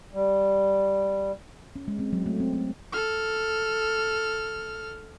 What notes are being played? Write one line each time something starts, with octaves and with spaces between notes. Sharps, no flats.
G3
C#4
G#3
C4
F#3
A3
C4
C4
A4 F6